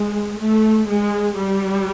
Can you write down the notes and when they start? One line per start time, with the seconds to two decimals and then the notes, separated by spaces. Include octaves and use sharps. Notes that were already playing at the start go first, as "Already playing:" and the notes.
Already playing: G#3
0.40 A3
0.89 G#3
1.38 G3